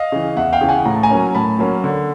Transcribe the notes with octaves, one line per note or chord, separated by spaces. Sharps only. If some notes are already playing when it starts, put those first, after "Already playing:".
Already playing: D#5 F5
C#3 E3
E2 E5 F#5
F5 G5
C#3 E3
F#5 G#5
A2 A#5
A5
G#5 A#5
F#3 A#3 C#4
A2 A5 B5
F#3 A#3 C#4
D3